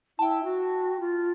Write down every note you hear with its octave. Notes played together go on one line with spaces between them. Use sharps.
E4 G5 A5
F#4
F4